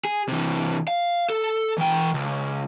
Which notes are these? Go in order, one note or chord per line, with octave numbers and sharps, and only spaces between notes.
G#4
C3 E3
F5
A4
E3 G5
C#2